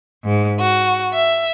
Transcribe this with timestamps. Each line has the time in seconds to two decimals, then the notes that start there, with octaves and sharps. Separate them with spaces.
0.25 G#2
0.60 F#4
1.13 E5